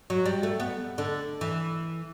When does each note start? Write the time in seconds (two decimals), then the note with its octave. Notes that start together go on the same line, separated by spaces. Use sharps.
0.10 F#3
0.25 G3
0.43 A3
0.60 B3
0.98 D3
1.41 E3